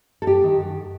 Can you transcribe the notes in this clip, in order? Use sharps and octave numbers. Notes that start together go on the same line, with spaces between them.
A4
F#2 G4
D#3
F#2